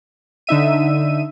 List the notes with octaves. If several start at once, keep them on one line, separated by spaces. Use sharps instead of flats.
D3 D#4 E5 D#7